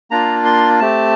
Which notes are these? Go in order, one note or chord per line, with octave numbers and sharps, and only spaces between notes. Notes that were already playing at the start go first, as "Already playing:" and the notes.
A#3 D4 F4 A#5
C6
A3 C4 G4 A5